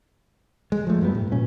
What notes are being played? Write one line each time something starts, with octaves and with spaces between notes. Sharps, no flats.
G#3
F3 A3
G2 F#3 G3 B3
A2
A#2 C#4